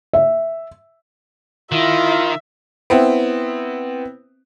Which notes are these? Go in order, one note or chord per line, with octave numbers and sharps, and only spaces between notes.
E5
D#3 E4 F4 E5
B3 C4 E4